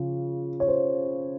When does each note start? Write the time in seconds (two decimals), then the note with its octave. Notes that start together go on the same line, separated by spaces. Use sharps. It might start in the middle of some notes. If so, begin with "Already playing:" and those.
Already playing: C#3 F3 F4
0.60 C#5
0.68 C5